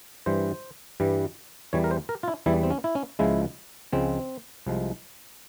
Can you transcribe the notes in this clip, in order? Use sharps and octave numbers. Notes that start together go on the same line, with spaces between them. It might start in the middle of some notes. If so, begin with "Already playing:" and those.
G2 E3 G3 C5
G2 E3 G3
E2 E3 G3 C#5
A#4
C5
A#4
F4
E4
E2 E3 G3 E4
C4
C#4
E4
C#4
C#2 C#3 F3 G#3 E4
C#2 C#3 F3 G#3 C4
C2 C3 F3 G#3